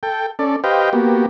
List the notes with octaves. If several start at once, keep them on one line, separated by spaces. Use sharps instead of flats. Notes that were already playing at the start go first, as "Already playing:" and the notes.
A4 G5
C#4 A4 D5
G4 B4 C5 D#5 F5 G5
A#3 B3 F#4 G4